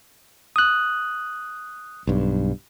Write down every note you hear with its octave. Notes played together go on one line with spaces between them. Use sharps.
D#6 F#6
B1 G2